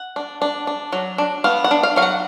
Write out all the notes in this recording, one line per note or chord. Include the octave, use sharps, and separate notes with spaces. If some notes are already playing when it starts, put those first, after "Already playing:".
Already playing: F#5
D4
D4
D4
F#3
D4
B3 F5
F#5
D4
F5
F#3 F5
F#5